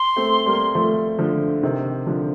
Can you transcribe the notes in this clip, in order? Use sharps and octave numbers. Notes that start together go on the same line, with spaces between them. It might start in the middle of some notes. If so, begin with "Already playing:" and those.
Already playing: C6
A3 C4
G3 A#3
F3 A3
D3 F3
C3 D#3
D3 F3